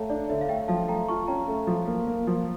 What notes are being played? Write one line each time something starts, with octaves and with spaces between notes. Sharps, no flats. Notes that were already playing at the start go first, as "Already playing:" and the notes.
Already playing: A3 C#5 F5 G5 A5 A#5
D4 D5
D3 C#5 E5
F5
A3 E5 G5
F3 F5 A5
A3 G5 A#5
F4 A5 C#6
C#4 G5 A#5
A3
F3
A#3
A#3
F3